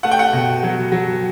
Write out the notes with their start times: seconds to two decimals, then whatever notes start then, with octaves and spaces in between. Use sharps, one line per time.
0.03 A3 F#5
0.11 G5
0.19 F#5
0.33 B2
0.63 F#3
0.92 F#3